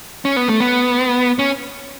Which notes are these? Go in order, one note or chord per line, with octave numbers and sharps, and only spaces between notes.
C#4
B3
A3
B3
C#4